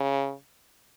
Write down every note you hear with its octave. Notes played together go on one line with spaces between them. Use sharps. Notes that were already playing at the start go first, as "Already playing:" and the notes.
Already playing: C#3